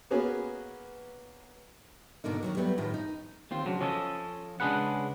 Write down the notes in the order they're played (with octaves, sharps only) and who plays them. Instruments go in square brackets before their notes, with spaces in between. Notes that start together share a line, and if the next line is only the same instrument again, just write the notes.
[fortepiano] A#3 B3 C#4 F#4 G#4 B4
[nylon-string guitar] G#2 B2 D3 A#3 D#4
D#3 F3 F#3
F#3 G3 A3 B3
A2 D#3 F3
D#4
[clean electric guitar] D#2 C4 F4
C#3 F#3 D4
F3 C#4 A4 C#5 D#5
C#3 G#3 D4 G#4 B4 F#5